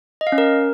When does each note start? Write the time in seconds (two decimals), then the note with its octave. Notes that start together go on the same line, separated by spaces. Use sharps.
0.21 D#5
0.27 F5
0.32 C#4
0.38 A#4